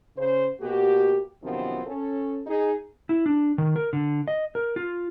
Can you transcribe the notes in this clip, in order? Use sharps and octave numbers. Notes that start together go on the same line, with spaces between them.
C#3 C5
B2 A#3 F#4 G4
F#2 C3 D#3 F3 B3 C4
C#4 A4
D#4 G#4
E4
D4
D#3
A#4
D3
D#5
A#4
F4